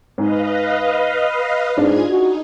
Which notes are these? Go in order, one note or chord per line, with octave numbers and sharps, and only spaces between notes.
G#2 B4 D#5 F5
G#2 D4 F4 G#4 G#6
D#4 F#4